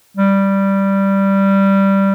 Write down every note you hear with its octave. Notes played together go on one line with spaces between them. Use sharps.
G3